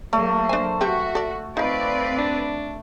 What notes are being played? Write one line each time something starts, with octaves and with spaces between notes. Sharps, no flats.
F#3 A3 A#3 D5
D4 C5 G#5
C4 F#4 G4 B4 E5
A4 D5
F3 C4 D#4 B4 D5 F5
D4